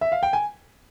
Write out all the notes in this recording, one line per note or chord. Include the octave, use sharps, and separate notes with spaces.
E5
F5
G5
G#5